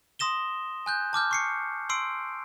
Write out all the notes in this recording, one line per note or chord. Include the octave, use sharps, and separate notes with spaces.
C6 D#6 A#6 E7 G7
G#5 F#6 G6
A5 D6 F6 G6
C#6 C7 C#7
C6 E6 C7 D7